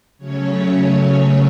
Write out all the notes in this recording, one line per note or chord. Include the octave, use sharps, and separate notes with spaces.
C#3 F#3 A3 C#4 C#5